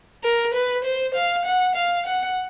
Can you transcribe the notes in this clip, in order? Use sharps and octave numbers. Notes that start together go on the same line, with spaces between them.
A#4
B4
C5
F5
F#5
F5
F#5